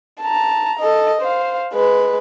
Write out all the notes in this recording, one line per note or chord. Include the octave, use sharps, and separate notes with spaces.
A5 A#5
A4 D#5
C5 F5
G#3 B4